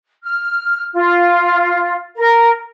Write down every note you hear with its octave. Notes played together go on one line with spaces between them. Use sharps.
F6
F4
A#4